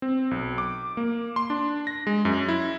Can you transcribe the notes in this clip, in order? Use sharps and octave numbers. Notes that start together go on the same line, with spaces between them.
C4
B1
D6
A#3
C6
D4
A#6
G#3
F#2
E4